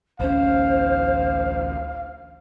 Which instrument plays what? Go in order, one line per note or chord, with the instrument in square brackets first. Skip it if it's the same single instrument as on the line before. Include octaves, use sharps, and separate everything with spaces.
[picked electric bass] A1 D2 C#4 [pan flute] C5 [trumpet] F5